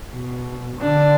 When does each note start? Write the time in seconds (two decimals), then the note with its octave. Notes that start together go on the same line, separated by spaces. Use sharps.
0.13 B2
0.81 D3 D4